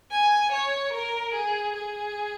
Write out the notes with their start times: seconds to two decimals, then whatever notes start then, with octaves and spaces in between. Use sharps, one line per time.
0.11 G#5
0.52 C#5
0.93 A#4
1.34 G#4
1.75 G#4